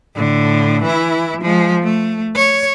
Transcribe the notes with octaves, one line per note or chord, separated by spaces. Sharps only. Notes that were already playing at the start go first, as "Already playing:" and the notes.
A2 D3
E3 E4
F3 G#3
A3
C#5